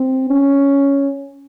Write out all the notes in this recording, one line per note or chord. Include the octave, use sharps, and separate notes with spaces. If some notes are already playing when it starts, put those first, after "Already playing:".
Already playing: C4
C#4